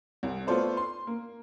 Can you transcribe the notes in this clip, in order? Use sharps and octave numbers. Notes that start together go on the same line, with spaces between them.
C2
A3 B3 F4 A4 C5 D5
C6
A#3